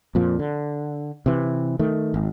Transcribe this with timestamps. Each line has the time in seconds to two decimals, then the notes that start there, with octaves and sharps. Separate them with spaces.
0.15 F2 A#2 F3
0.39 D3
1.26 C3 E3
1.79 D#3 A3
2.14 G#1